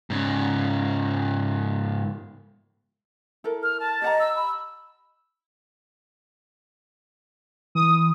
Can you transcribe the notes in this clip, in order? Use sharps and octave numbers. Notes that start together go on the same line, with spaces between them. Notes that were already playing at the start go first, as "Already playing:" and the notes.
G#2 C#3
E4 A4 A#4
F6
A5
G4 D#5 F#5 A#5
E6
B5
E3 D#6